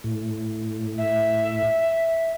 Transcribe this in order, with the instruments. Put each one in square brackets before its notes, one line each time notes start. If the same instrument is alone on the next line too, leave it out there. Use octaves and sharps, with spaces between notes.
[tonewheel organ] A2
[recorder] E5